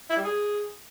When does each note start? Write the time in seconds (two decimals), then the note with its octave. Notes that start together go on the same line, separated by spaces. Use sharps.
0.09 E4
0.17 G3
0.24 G#4